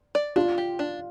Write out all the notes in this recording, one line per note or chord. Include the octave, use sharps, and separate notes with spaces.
D5
D4 F4
G4
D4